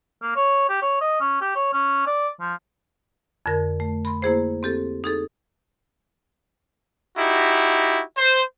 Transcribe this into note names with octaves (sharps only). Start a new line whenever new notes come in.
A#3
C#5
G4
C#5
D#5
C#4
G4
C#5
C#4
D5
F3
F2 D3 A#4 G#6
A3
B5 C6
A#3 E4 G#4 C5
C4 G4 A4
D#4 G#4 A4
D#4 E4 F#4 G4
C5